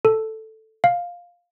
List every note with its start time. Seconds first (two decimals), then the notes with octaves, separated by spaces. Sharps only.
0.05 A4
0.84 F5